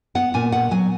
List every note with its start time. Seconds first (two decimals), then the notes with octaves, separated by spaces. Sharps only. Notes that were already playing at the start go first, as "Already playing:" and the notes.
0.15 B3 F#5
0.34 A#2 G#5
0.52 B3 F#5
0.71 F#3 G#5